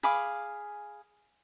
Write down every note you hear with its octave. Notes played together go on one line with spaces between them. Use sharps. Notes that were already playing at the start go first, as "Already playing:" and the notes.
G#4 F5 B5 D6